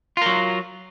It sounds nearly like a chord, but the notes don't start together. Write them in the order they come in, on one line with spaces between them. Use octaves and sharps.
F4 A#4 F#3